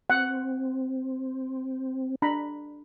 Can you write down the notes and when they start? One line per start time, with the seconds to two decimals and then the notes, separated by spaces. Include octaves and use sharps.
0.10 C4 F#5
2.22 D4 A#5 B5